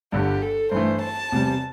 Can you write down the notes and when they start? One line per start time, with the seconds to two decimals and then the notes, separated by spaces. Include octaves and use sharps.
0.12 G1 G2 D3 G4
0.42 A4
0.71 G2 E3 A3 C5
1.01 A5
1.32 E2 C3 G3